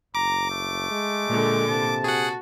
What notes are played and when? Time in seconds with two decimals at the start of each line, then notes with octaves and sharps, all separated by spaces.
0.15 F#1 A#5 D6
0.51 A3
0.91 G#3
1.28 A#2 D3
1.69 C3 A5
2.04 F#4 G#4 F#5